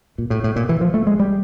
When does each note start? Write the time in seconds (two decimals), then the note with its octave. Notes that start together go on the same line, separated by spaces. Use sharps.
0.18 A#2
0.30 A2
0.44 A2
0.56 A#2
0.69 E3
0.81 F3
0.94 A3
1.07 G#3
1.20 G3